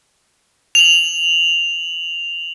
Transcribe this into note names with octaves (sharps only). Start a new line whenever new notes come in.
F7 F#7